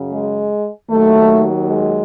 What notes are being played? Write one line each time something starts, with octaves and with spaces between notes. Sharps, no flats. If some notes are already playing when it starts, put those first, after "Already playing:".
Already playing: F#2 C#3
G#3
D#2 D#3 F#3 A3
G#3